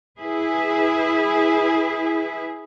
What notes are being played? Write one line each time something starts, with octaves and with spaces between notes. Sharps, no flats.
E4 G#4 B4